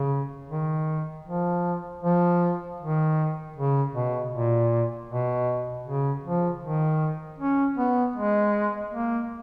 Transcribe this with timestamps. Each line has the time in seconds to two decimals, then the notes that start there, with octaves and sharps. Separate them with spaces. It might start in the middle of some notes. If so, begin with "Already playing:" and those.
Already playing: C#3
0.50 D#3
1.26 F3
2.03 F3
2.81 D#3
3.56 C#3
3.94 B2
4.33 A#2
5.10 B2
5.86 C#3
6.24 F3
6.63 D#3
7.39 C#4
7.78 B3
8.16 G#3
8.93 A#3